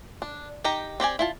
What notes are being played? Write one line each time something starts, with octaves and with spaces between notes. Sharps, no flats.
D4
D#4 G4 G5 A#5
C4 G4 D5 G#5
E4 F4 A5